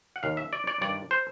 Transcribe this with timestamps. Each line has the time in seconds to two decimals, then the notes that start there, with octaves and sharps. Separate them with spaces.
0.16 F#5
0.23 D#2 D#3 F5
0.37 E5
0.53 D5
0.67 D5
0.81 G2 D#3 D5
1.11 C5